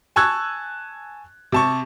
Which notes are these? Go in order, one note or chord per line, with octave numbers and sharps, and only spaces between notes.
G#5 A5 C#6 E6 F#6 G#6
C3 A5 C#6